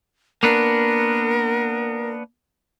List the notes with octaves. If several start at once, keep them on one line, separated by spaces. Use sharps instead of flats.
A#3 B3 D4 A#4